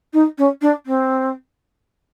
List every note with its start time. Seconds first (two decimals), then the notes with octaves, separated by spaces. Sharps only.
0.13 D#4
0.38 C#4
0.62 D4
0.86 C4